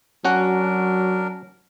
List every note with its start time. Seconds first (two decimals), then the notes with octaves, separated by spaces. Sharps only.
0.25 F#3 C#4 D4 F#4 A#4 F#5